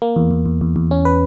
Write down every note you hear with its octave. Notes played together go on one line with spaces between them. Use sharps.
A#3
E2
E2
E2
E2
E2
C#4
B4